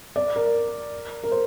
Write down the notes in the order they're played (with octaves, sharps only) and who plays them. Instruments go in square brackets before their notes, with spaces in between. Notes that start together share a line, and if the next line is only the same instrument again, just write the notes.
[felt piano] D5
A#4
A#4
C5